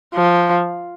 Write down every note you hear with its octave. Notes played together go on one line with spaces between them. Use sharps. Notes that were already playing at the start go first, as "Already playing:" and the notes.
F3